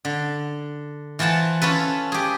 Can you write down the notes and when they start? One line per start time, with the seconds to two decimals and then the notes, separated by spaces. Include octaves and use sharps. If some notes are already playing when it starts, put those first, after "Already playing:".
0.05 D3
1.19 E3 F4 C5 F#5 A5
1.62 C#4 F4 A4 B4
2.12 G4 G#4